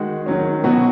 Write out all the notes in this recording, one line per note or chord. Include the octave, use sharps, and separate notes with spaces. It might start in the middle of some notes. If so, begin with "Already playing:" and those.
Already playing: D#3 G#3 F#4
D#3 F#3 C#4
B2 F#3 B3 F#4